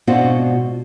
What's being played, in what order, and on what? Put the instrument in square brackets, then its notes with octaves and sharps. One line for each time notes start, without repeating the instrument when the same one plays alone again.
[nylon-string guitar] G#2 B2 C4 D4 F4 F#4